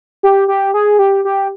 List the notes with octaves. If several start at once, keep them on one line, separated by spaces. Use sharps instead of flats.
G4
G4
G#4
G4
G4